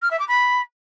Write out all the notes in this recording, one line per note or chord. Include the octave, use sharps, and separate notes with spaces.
F6
E5
D6
B5